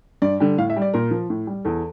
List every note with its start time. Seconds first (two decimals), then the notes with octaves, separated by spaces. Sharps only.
0.22 G2 D5
0.40 D3 G3
0.58 A2 F5
0.70 E5
0.76 G3
0.82 D5
0.94 A#2 A#4
1.11 F3
1.30 A2
1.47 G3
1.65 E2 A4